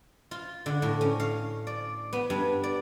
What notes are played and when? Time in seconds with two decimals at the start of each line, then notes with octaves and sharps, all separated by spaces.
0.31 F4
0.66 D3
0.82 A2
1.01 C#4
1.20 F5
1.67 D5
2.13 B3
2.30 G2
2.63 D5